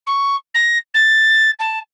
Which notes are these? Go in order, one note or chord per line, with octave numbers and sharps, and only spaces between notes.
C#6
A#6
A6
A5